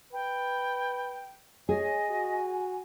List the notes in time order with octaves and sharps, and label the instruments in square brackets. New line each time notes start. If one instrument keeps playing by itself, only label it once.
[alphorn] B4 [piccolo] G5
[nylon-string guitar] G#4 [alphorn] C#5 [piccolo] D#5 [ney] G#5
[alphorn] F#4